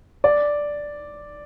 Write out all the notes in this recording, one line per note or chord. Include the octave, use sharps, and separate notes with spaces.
D5